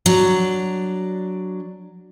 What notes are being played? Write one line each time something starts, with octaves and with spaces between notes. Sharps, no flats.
F#3 D4